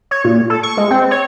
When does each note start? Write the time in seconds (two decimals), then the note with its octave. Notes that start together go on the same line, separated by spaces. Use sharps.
0.11 C#5
0.24 A#2
0.50 A4
0.63 C#6
0.77 G#3
0.91 C4
1.11 C#5